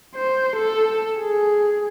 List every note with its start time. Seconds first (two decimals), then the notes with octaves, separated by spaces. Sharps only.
0.15 C5
0.56 A4
1.19 G#4